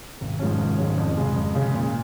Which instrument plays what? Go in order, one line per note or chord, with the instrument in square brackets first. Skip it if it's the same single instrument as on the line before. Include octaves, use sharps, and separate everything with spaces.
[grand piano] G#1
G#2 F3 G#3 C#4
G#1
G#2 F3 G#3 C#4
F2
C#3 G#3
F2
C#3 G#3
A#2